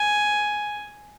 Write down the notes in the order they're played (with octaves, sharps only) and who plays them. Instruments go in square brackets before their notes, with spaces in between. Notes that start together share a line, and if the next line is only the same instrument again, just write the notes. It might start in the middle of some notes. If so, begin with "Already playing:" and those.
Already playing: [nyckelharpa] G#5